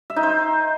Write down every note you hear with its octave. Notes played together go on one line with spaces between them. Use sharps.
E5
D#4
C5